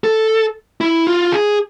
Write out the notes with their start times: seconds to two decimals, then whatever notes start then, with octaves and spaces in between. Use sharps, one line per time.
0.04 A4
0.81 E4
1.07 F4
1.32 G#4